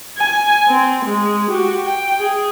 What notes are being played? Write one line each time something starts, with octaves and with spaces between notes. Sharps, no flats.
G#5
C4
G#3
F#4 G4
G5
G#4